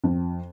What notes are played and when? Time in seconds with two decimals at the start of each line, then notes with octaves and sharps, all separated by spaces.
0.04 F2